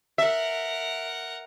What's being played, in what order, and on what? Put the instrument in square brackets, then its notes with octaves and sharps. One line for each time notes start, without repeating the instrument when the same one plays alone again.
[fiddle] A#4 F#5 [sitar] E5